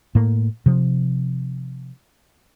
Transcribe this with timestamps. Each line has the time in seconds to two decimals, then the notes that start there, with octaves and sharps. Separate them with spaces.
0.15 A2 A#3
0.66 C3 F3